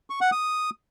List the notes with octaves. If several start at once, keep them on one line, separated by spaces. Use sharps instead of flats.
C#6
F#5
D#6